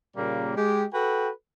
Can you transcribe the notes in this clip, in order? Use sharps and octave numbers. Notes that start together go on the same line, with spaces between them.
A#2 C#3 G3 A#3
G#3 G4
F#4 A4 B4 G5